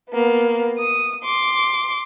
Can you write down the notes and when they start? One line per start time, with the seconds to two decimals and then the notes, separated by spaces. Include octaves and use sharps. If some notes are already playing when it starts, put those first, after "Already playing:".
0.11 A#3 B3
0.79 D#6
1.24 C6 D6